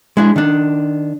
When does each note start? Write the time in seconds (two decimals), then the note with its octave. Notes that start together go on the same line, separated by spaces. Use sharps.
0.17 G#3 D4 E4
0.36 D#3 D4